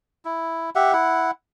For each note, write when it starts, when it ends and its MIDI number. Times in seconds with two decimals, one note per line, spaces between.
0.25 0.70 64
0.75 0.93 67
0.75 0.93 76
0.75 0.93 78
0.93 1.31 64
0.93 1.31 78